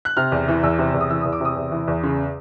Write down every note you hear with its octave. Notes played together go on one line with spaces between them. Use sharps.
F#6
C3 F6
E2
E3
E2 E6
C3
E2
D#6
E3 E6
D#6
E2
D6
C3 D#6
E2
E3
E2
C#3